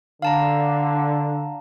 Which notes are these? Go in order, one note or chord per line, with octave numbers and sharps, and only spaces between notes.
D3 F5 A5 A#5